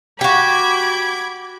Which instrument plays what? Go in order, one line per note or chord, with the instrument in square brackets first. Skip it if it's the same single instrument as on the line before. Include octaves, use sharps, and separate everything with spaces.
[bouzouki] F#4 G4 [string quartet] B5 D6 G#6